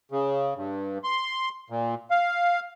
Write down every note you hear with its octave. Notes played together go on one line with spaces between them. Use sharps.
C#3
G2
C6
A#2
F5